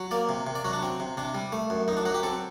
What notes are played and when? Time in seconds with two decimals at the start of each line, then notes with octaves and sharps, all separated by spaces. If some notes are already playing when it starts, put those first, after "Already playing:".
Already playing: F#3
0.11 A#3 D5
0.29 C3
0.47 C3
0.55 D5
0.65 F#3 F#4
0.73 D4
0.83 C4
1.00 C3
1.17 C3 D4
1.35 G3
1.52 A3
1.70 F#2
1.88 F#2 D#4
1.97 D4
2.05 F#3 F#4
2.14 G4
2.23 C4 A4